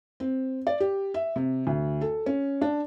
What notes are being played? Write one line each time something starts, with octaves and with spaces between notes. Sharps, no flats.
C4
D5
G4
E5
C3
D2
A4
C#4
D4